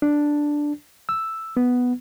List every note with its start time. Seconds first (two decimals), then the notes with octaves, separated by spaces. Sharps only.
0.02 D4
1.09 E6
1.57 B3